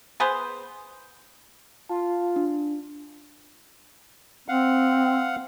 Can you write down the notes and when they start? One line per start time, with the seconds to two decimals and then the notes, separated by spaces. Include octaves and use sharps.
0.20 B3 G#4 B4 C5
1.89 F4 A5
2.36 D4
4.48 C4 F5 F#5